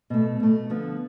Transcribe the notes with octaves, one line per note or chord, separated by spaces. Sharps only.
B2 A3
B2 A3
D3 F3 B3